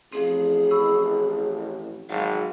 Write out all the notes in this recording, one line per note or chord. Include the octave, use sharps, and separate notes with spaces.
A1 F3 C4 G#4
B5 C#6 E6
G#1 F#3 F5